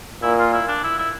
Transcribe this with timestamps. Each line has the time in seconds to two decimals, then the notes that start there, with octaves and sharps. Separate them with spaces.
0.22 A#2 E4
0.38 F4
0.53 E4
0.68 D4
0.83 E4
0.99 E4